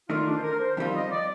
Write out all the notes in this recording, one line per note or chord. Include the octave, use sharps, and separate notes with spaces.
D#3 A3 D#4 F4 A#4 D5
D4
C5
A#4
C5
F2 D#3 G3 C4 F4
D#5
D5